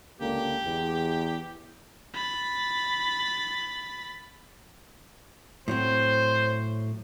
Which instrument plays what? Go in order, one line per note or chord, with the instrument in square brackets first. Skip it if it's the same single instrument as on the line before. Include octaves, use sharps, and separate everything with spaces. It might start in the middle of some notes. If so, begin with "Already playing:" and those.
[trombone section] C#2 D3 A#3 [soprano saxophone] G4
[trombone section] E2
[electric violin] B5 A6
[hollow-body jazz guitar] A2 F#3 C4 [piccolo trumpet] C5